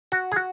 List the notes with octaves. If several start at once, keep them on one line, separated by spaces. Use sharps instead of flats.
F#4
G#4
F#4